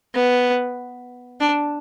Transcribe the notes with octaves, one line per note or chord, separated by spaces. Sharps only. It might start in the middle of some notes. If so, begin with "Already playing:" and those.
B3
D4